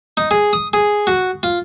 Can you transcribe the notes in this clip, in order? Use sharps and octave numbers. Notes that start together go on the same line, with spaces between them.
D#4
G#4
D#6
G#4
F#4
F4